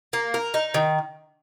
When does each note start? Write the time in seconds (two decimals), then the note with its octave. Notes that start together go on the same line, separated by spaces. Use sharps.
0.13 A#3
0.34 A#4
0.54 D#4
0.74 D#3